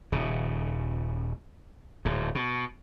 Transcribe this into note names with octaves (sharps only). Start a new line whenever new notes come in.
D#1 C#3
D1 G#2
B2